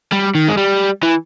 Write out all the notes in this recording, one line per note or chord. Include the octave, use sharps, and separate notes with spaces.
G3
D#3
G#3
G3
E3